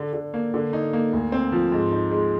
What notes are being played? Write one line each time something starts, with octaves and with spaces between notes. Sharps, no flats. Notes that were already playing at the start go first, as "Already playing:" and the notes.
Already playing: D3
D3
A#3
D3
D#4
A#3
D2
C4
F3
G#2
D#4
G#3